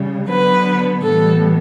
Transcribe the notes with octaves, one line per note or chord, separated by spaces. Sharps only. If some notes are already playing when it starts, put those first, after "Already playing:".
Already playing: C#3 G3
D3 F#3 B3 B4
A2 E3 G3 B3 A4